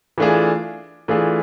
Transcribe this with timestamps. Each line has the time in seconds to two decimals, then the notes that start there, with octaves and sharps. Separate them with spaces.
0.18 E3 A3 D4 F4 G#4
1.08 E3 A3 D4 F4 G#4